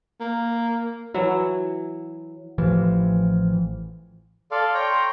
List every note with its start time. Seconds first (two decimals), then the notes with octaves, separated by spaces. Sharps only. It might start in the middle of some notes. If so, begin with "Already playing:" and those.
0.20 A#3
1.14 E3 F#3 E4
2.58 A1 E3 F3
4.51 A4 D5 F5 C6
4.74 C#5 G5 A#5